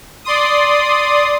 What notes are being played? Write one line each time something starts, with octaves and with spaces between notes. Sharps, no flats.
D5 C6 D#6